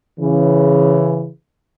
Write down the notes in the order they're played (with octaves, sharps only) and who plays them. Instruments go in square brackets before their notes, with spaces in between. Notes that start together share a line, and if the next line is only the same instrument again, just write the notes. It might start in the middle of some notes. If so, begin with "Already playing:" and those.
[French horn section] C#3 E3